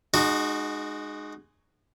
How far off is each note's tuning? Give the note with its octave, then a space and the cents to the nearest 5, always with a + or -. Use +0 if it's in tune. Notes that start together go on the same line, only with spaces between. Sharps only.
G#3 +0 D#4 -35 F#4 +0